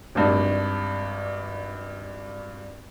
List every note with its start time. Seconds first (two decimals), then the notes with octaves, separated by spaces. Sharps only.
0.15 G#1 G2 D4